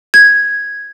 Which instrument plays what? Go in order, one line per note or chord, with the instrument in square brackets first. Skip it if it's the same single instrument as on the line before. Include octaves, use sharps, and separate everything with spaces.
[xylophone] G#6